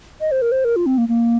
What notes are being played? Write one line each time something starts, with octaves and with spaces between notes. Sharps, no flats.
D#5
C5
A#4
C5
A#4
F4
C4
A#3
A#3